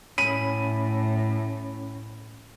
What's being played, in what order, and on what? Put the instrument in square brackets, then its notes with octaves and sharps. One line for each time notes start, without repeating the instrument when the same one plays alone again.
[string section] A2 [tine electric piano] C#4 B5 [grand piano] D#7